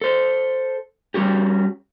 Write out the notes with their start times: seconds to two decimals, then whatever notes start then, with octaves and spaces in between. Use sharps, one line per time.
0.01 A4 C5
1.14 G3 C#4 F#4 G4